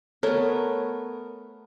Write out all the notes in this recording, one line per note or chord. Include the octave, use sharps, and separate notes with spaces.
A3 B3 A#4 C#5